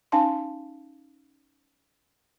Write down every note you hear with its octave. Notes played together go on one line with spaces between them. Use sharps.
C#4 D#4 F5 G#5 A5 C6